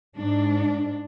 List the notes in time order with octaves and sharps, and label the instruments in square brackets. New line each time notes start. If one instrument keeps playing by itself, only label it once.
[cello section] G#2 D4